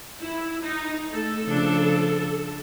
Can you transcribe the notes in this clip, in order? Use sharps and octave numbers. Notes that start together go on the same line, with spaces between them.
E4
D#4
A3 A4
C#3 F3 D4